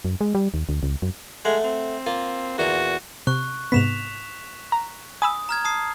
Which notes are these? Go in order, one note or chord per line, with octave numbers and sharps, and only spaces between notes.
F#2
G#3
G3
D#2
D2
C#2
F#2
G#3 A3 F#5
C4
A#3 F4
E2 A#2 F#4 A#4
C3 C#6 F#6
G#2 C3 B3 B6 E7 F7
A#5
G#5 B5 D#6 E6
A#5 F6 G#6
A5 D#6 C7